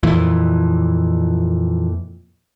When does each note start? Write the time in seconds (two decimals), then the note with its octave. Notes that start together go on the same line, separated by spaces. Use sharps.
0.03 F2 A#2 E3